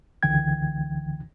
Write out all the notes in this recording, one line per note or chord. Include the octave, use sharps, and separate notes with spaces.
C#2 D3 E3 G5 G#6